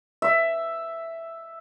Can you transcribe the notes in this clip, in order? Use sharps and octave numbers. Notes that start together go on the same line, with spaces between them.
E5